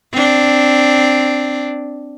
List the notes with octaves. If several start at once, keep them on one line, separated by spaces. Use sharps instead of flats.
C4 D4